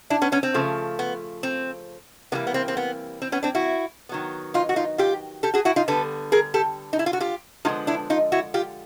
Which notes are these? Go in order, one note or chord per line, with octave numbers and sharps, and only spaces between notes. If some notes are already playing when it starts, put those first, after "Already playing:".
D4 E4
B3 C#4
B3 C#4
C4
C#3 F3 A3
B3
C4
C3 E3 G3 A#3 B3
B3
C4
C4
B3
C4
B3 C#4
C4 D4
E4 F#4
D#3 F#3 B3
D#4 F4
F#4
D#4 F4
F4 G4
G4 A4
F#4 G#4
E4 F#4
D#4 F4
D3 G3 B3 A4 B4
G#4 A#4
G4 A4
D#4
E4
F4
F#4
F4 G4
D3 F3 G#3 B3 D#4 F4
D4 E4
D#4 F4
E4 F#4
F4 G4